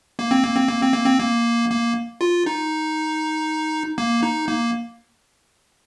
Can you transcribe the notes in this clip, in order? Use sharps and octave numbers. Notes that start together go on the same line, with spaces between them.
A#3
C4
A#3
C4
A#3
C4
A#3
C4
A#3
A#3
F4
D#4
A#3
D#4
A#3